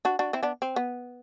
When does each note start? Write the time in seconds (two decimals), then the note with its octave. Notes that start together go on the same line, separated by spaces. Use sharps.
0.05 D4 F#4
0.19 D4 F#4
0.33 C4 E4
0.43 B3 D4
0.62 C4
0.76 B3